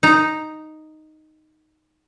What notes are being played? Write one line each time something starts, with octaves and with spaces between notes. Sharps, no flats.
D#4 A#5